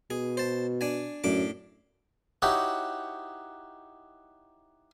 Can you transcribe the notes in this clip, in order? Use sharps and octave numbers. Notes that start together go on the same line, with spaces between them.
B2 G#4
C5 A5
D4 G#5
F#2 A2 D4 D6
D#4 E4 F#4 G4 C#5 F#5